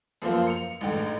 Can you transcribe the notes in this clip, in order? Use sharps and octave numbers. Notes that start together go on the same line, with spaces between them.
F#2 F3 A#3 C5 F5
C#7 F7
A1 G#2 D3 G5